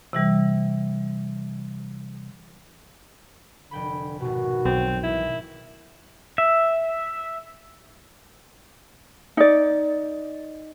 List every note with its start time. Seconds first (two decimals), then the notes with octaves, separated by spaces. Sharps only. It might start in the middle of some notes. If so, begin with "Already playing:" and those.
0.13 C3 E3 G3
3.71 F1 D3 G5 B5
4.21 G#1 B2 F#4
4.65 B1 C4
5.03 E3 E4 G#4
6.38 E5
9.37 D#4 D5